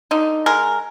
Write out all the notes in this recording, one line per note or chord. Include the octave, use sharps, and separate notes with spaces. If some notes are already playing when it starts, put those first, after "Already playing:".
D3 D#4
G#3 A#4